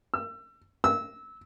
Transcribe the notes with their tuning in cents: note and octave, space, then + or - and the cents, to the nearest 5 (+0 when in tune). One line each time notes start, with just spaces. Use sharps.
E6 +30
E6 -20